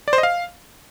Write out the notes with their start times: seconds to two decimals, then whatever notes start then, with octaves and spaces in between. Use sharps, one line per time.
0.08 D5
0.13 C5
0.18 D#5
0.23 F5